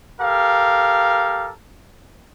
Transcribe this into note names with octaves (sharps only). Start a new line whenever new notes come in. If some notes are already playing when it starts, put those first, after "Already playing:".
G4 A4 A#4 F5